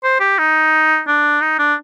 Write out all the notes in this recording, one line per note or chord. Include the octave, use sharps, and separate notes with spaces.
C5
G4
D#4
D4
D#4
D4